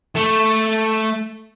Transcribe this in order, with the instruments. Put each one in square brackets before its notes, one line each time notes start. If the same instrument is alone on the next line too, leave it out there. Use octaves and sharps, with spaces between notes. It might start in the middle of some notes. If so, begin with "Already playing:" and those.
[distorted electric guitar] A3